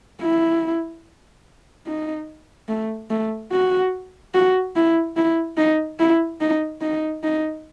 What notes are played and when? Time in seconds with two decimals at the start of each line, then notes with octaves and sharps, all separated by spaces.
0.21 E4
1.87 D#4
2.69 A3
3.10 A3
3.52 F#4
4.34 F#4
4.76 E4
5.17 E4
5.57 D#4
5.99 E4
6.41 D#4
6.81 D#4
7.23 D#4